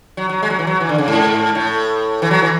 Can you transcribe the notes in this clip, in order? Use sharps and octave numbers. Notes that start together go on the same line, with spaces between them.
F#3
F#3
G#3
F#3
E3
F#3
E3
D3
C#3
G#2
A2
E3
F#3
E3